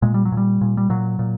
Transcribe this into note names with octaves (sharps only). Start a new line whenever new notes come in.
A#2 G#3
G3
F#3
A#2
G3
A#2
G3
A#2 F#3
A#2